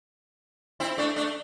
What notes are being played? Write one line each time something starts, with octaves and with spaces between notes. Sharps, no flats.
C4 E4
A3 D4
A3 D4